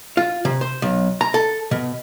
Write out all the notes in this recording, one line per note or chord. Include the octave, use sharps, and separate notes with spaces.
F4
C3
C5
B1
A#5
A4
B2